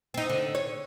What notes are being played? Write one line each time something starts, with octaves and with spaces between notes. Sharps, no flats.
C4 D#4
D3
C#5